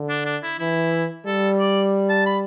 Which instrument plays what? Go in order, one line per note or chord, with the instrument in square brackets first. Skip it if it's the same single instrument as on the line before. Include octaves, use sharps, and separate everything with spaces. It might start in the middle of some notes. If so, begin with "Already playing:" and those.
Already playing: [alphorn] D3
[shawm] D4
D4
E4
[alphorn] E3 [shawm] E4
[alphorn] G3 [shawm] A4
[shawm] D5
A5
B5